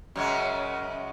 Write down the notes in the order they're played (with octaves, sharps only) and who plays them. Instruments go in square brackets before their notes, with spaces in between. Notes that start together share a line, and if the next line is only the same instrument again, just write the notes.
[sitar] F#2 C#3 G#3